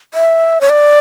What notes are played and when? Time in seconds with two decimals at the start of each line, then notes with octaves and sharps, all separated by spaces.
0.14 E5
0.61 C#5
0.69 D5